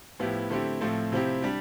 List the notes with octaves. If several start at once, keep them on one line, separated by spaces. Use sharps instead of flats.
A2 F3 B3 E4 G4
D3 A3 C4 E4 G4
A2 F3 A3 C4
C3 F3 C4 E4 G4
G3 D4 G4